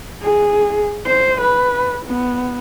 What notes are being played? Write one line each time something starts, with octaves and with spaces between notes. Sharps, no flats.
G#4
C5
B4
B3